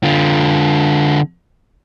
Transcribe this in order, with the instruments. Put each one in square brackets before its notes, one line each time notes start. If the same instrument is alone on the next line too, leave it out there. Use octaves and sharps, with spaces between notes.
[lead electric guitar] D3 F4